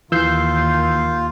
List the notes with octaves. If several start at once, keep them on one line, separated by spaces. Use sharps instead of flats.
D#2 E3 F4 E6 G6 C7